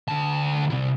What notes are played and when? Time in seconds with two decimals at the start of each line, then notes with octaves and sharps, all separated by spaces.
0.09 D2 A5
0.71 C3 E4